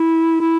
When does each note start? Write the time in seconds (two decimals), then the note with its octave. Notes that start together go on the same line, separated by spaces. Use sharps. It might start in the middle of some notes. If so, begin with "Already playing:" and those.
Already playing: E4
0.40 E4